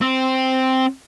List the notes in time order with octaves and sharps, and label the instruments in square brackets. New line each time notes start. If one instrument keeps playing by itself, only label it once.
[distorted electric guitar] C4